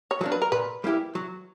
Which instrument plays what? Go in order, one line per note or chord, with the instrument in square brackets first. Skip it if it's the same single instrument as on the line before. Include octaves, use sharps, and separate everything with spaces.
[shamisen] C#5
[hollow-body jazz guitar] F#3 A#3 D4
[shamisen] B4
A#4
[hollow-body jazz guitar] A#2 [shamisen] B4
[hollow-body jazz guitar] G3 A#3 E4 G4
F#3